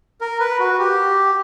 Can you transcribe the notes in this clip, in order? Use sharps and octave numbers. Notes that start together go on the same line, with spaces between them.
A#4
B4
F#4
G4